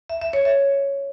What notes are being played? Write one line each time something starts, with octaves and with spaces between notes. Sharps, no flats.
E5
E5
C#5
E5